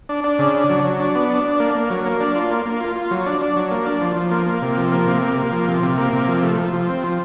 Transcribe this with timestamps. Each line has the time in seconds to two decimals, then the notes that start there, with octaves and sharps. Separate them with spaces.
0.09 D4
0.24 D4
0.39 C#3
0.54 D4
0.70 F#3
0.84 F#3
1.00 D4
1.15 B3
1.30 D4
1.45 D4
1.60 A#3
1.75 A#3
1.90 F#3
2.05 A#3
2.20 D4
2.35 F4
2.51 A#3
2.66 A#3
2.81 F4
2.96 F4
3.11 F#3
3.26 D4
3.41 D4
3.56 F#3
3.71 A#3
3.86 D4
4.01 F3
4.16 F3
4.31 A#3
4.46 A#3
4.62 C3
4.77 F3
4.92 A#3
5.07 C3
5.22 A#3
5.37 A#3
5.52 F3
5.68 C3
5.83 C3
5.98 A#3
6.13 C3
6.28 F3
6.43 A3
6.58 F3
6.73 F3
6.89 C4
7.04 F3